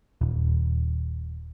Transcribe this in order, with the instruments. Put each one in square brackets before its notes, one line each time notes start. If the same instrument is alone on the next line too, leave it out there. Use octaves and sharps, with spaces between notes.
[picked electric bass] D#1